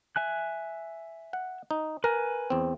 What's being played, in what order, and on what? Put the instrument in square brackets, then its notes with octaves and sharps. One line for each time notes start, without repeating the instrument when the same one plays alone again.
[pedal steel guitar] E5 G#5 F#6
[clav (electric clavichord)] F#5
D#4
[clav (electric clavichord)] A#4 [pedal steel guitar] B4 G#5
[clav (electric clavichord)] E2 C4